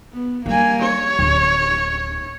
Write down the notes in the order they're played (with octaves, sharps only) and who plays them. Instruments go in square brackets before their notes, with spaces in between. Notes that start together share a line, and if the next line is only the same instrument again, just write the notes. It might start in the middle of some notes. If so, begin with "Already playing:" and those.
[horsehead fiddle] B3
[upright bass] G3 [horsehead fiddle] A#3 G#5
[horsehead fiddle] C#5
[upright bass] D1